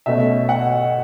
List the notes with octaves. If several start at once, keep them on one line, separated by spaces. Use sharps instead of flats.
B2 A3 C#4 E5
F#5